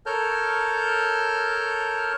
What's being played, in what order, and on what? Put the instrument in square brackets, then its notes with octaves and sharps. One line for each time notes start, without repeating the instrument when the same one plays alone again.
[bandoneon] A4 A#4 C#5 A5 F6 G6